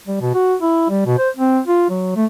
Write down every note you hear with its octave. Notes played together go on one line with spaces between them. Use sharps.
G3
B2
F#4
E4
G3
B2
C5
C4
F4
F#3
A3